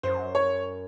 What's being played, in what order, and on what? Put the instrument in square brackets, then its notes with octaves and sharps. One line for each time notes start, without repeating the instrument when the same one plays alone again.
[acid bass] F#2 [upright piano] C5
[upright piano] C#5